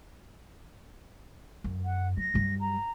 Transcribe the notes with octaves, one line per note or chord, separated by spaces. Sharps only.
F#2
F#5
F#3 A#6
G2 F#3
A#5